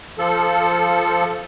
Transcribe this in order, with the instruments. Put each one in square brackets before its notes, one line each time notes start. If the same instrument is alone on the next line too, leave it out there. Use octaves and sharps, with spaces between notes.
[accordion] F3 A4